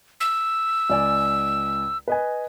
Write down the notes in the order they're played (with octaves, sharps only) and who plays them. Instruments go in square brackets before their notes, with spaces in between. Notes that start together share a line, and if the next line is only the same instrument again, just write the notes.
[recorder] E6
[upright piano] C#2 D5 G#5
B4 D#5 G#5